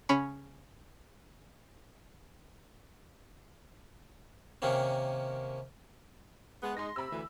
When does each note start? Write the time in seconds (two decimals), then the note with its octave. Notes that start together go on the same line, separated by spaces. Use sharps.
0.09 C#3 C#4 B5 C#6
4.62 C3 D#3 A#3 C4 C#4
6.63 G#3 B3
6.77 G#3 D#4 C6 A#6
6.96 C3 B5 E6
7.11 D2 E3